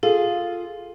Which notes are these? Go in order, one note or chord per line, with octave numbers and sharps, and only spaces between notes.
F4 G#4 A4